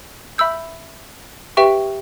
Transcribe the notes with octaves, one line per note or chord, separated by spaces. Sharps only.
E5 B5 E6 G6
G4 B4 E5 G5 C#6